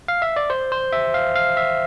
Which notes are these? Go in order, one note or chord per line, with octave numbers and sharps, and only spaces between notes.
F5
E5
D5
C5
C5
E5
F5
F5
E5